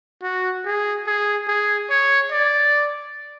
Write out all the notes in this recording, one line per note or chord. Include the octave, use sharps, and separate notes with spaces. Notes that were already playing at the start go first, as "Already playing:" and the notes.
F#4
G#4
G#4
G#4
C#5
D5